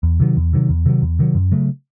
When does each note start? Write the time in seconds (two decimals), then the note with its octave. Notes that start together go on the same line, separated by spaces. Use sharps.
0.03 E2
0.20 C3 D#3 F#3
0.37 E2
0.53 C3 D#3 F#3
0.70 E2
0.86 C3 D#3 F#3
1.02 E2
1.19 C3 D#3 F#3
1.35 F#2
1.52 C#3 F#3 A3